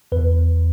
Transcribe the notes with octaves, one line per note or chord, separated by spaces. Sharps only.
E2 B4